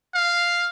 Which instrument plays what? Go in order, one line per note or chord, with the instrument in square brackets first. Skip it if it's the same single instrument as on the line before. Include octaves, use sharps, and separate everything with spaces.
[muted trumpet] F5